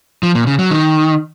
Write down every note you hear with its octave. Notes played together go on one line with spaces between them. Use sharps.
F3
A#2
C#3
F#3
D#3